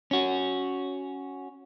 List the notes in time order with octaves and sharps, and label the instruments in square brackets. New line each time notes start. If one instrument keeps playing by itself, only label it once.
[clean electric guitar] C#4 F#4